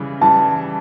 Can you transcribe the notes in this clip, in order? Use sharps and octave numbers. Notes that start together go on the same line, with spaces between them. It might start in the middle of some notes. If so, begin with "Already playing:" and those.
Already playing: C#3 E3 G3
E3 G3 A5